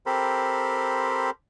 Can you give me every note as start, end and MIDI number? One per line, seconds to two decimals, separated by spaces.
0.06 1.30 60
0.06 1.30 67
0.06 1.30 69
0.06 1.30 70
0.06 1.30 72
0.06 1.30 83